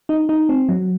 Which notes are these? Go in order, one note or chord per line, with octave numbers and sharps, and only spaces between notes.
D#4
D#4
C4
F#3